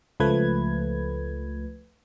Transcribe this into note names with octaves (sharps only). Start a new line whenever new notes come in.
C#2 F3 A3 B4 G#6